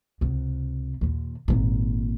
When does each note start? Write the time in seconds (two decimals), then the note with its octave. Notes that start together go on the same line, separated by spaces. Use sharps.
0.21 C#2 C3
1.01 D#2 A#2
1.48 G#1 A#2